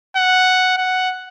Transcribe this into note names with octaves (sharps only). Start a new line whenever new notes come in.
F#5
F#5